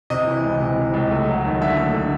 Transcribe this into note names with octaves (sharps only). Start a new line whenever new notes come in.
C3 D#5
E3
C#2
C3
C3
C#2
A3
F#3
D#2
D3 E5
A3
D3